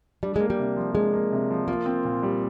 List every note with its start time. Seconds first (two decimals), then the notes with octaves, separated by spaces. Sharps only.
0.23 G3 D4
0.36 G#3 A#3
0.50 G3
0.59 C3
0.76 F3
0.95 G#3 D4
1.13 A#3
1.32 C3
1.51 F3
1.68 A#3 F4
1.86 C4
2.05 A#2
2.23 G3